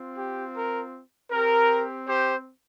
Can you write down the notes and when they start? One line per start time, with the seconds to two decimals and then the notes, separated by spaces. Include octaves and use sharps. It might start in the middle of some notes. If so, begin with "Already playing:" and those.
Already playing: C4 F4
0.18 G4
0.56 A#4
1.31 C4 G4 A#4
2.07 G4 C5